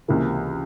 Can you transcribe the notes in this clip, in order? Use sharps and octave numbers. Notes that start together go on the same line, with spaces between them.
C#2 C3 E3 A#3